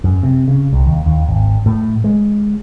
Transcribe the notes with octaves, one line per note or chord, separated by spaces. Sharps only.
F#2
C3
C#3
C2
D#2
D#2
G#1
A2
G#3